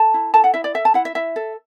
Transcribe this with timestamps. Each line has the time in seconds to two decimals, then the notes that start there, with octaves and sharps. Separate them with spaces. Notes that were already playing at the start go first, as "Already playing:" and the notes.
Already playing: A4 A5
0.14 E4
0.34 A4 A5
0.44 F#5
0.54 E4 E5
0.64 D5
0.74 A4 E5
0.85 A5
0.94 E4 F#5
1.05 E5
1.15 E4 E5
1.36 A4